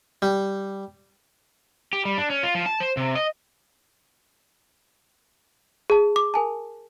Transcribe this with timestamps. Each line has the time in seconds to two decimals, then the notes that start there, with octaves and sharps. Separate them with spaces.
0.22 G3
1.93 G4
2.05 G3
2.18 D4
2.30 C#4
2.43 F4
2.55 F3
2.66 A5
2.80 C5
2.97 C3
3.15 D#5
5.90 G#4 A5
6.16 D6
6.34 A#4 G#5 A5